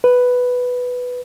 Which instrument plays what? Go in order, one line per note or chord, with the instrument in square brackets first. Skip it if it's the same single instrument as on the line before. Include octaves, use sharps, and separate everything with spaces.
[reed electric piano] B4